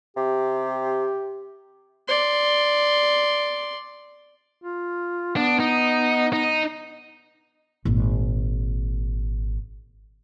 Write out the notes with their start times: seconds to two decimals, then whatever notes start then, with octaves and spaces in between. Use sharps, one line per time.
0.17 C3 G4
2.08 D5 C6
4.62 F4
5.36 B3 D4
5.59 D#4
6.33 D#4
7.85 G#1 A#2